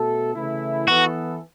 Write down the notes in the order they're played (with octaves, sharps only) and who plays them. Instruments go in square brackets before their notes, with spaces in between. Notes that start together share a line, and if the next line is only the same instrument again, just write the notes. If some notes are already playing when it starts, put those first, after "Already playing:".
Already playing: [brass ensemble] B2 A3 F#4 A4
C#3 E3 A3 E4
[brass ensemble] E3 B3 A4 [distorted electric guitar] F#4